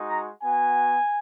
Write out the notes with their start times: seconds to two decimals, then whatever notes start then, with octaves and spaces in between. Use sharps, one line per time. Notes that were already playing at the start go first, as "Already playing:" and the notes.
Already playing: G#3 D#4 F#4
0.10 A#5
0.43 B3 F#4 G#5